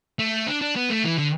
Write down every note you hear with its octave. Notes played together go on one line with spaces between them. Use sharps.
A3
D4
D4
B3
A3
E3
D3